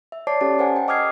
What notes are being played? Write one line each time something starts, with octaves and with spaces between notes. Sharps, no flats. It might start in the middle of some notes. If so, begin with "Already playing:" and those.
E5
C#5 D5 A5 D6 C7
C#4 G4 A4 A5
A#4 C5 F#5 G#5
G5
D#5 D6 D#6 F6 G#6 C7